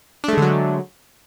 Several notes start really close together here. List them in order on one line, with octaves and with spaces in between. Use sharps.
D4 A3 G#3 D3 F#3